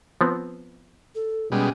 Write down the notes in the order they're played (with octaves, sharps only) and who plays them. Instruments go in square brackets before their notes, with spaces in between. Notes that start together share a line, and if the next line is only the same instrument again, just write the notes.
[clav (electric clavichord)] F3 B3 C4
[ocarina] A4
[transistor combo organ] B2 G3 G#3 [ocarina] C#4